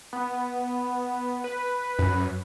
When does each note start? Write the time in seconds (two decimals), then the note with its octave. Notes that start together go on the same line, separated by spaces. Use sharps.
0.13 B3
1.44 B4
1.99 F#2